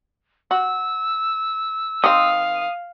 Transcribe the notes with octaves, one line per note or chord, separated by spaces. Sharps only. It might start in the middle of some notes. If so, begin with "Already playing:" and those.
F#4 E6
D#3 C4 F5 D#6